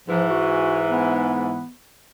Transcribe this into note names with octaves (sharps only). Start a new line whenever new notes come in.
G#2 E3 F3
F#4
B3